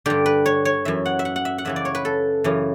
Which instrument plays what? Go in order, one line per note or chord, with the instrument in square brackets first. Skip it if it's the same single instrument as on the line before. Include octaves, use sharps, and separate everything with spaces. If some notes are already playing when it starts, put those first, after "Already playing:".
[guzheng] G2 D3 G4
B4
C#5
C#5
F#2 E3 E5
F#5
E5
F#5
F#5
E5
F#5
F#2 C#3 E3 E5
D5
C#5
B4
A4
F#2 C#3 E3